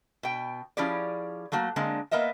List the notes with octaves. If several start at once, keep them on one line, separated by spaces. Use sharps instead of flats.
B2 G5
F3 C#4 E4 G4 G#4 D5
F#3 A3 A#3 F#4
D3 G#3 A#3 C4
A#3 B3 A#4 D#5 E5